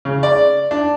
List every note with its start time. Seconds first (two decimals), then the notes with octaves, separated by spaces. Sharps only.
0.05 C#3
0.23 D5
0.71 D4